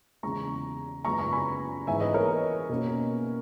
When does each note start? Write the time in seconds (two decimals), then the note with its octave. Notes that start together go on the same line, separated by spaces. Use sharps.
0.23 E2 C#3 G#3 A#5 C#6
1.05 F#2 C#3 G#3 B3 A#5 C#6
1.19 A#5 C#6
1.33 G#5 B5
1.87 G#2 E3 G#3 B3 E5 G#5
2.00 B4 D#5
2.14 A#4 C#5
2.69 B2 A#3 C#4